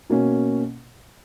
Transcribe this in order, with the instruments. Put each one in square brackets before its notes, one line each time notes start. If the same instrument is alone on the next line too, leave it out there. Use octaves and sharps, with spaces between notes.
[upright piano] B2 A#3 C#4